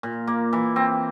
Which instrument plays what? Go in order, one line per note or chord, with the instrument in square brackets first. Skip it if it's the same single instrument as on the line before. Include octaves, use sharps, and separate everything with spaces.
[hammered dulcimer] A#2
A#3
E3
C4